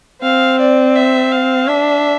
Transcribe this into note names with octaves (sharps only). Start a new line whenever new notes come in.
C4 F5
D5
E5
F5
D4 E5